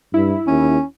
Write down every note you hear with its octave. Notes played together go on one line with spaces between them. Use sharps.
G2 E4
D#2 C#4